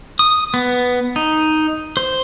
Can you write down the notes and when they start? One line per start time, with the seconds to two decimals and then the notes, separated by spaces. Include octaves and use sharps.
0.19 D#6
0.54 B3
1.16 D#4
1.97 C5